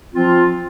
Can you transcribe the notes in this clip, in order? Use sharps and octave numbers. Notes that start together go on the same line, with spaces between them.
F3 C4 F4